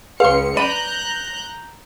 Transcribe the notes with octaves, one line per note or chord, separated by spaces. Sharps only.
C#2 B4 F5 C6 C#7
D5 A#5 B5 F#6 G6 D#7